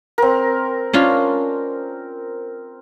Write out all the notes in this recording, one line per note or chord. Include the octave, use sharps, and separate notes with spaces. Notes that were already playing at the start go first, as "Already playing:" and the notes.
C4 A#4
C#4 D4 F4